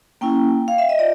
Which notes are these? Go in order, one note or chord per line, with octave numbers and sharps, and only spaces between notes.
A#3 C#4 E4 G5
F5
E5
D#5
F4 D5